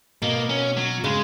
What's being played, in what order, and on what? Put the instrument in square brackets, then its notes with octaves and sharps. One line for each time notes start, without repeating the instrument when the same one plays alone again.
[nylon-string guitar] B2 [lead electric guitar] A#3
[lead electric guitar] C#4
F#3
[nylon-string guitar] C#3 [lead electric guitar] G#3